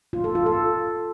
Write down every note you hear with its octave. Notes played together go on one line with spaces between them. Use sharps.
F4
A4
F4
A4